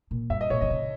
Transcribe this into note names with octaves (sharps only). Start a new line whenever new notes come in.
A#2
G2 E5
D#5
A#2 C#5
D#3 D#5
C#3